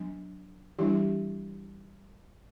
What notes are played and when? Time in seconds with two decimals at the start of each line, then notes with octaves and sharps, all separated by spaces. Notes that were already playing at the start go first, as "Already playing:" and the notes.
Already playing: F#3 B3 D4
0.79 E3 G3 D4 E4 G4